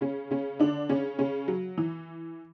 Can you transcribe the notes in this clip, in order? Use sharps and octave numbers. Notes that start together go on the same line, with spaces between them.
C#3 C#4
C#3 C#4
D3 D4
C#3 C#4
C#3 C#4
F#3
E3